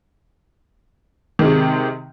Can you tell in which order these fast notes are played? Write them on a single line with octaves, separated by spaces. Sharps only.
D#3 G#3 C3